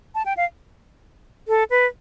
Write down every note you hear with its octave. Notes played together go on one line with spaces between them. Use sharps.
A5
G5
F5
A4
B4